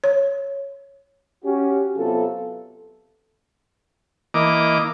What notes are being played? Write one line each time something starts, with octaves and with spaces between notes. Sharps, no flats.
C#5
C#4 F#4 G4
C3 F#3 B3 F4 A4
E3 A#3 D#5 D6